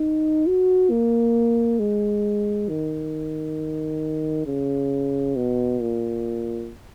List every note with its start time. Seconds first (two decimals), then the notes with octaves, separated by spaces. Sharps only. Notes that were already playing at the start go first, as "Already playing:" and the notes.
Already playing: D#4
0.47 F#4
0.90 A#3
1.79 G#3
2.69 D#3
4.46 C#3
5.36 B2
5.80 A#2